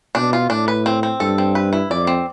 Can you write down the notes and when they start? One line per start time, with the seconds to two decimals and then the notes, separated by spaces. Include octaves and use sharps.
0.15 B2 D4
0.33 F4
0.50 A2 D4
0.68 B4
0.86 C4
1.03 C4
1.20 G2 A4
1.38 C4
1.55 B4
1.73 E4
1.90 F2 D5
2.07 C4